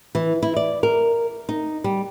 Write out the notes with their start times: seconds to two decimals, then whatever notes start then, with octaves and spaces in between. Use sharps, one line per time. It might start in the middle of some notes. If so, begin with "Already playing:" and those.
0.15 E3
0.42 E4
0.56 D5
0.83 A#4
1.49 D#4
1.84 G3